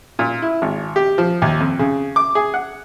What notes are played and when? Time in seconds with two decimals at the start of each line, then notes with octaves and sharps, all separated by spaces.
0.19 A#2
0.42 E4
0.62 G#1
0.96 G4
1.18 F3
1.42 D#2
1.60 F2
1.79 C#3
2.16 D6
2.35 G#4
2.54 F#5